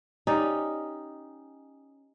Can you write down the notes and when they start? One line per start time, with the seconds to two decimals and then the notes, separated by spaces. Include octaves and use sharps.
0.27 C#4 D#4 G4 D5